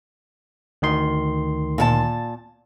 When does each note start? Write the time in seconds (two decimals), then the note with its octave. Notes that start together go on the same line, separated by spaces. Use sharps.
0.82 D2 D#3 C6
1.78 A#2 A#4 A5